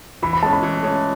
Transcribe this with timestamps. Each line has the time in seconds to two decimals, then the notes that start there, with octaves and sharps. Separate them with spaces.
0.22 E3 B5
0.33 B5
0.43 G#3 C#4 A5
0.53 B5
0.63 E3
0.83 G#3 C#4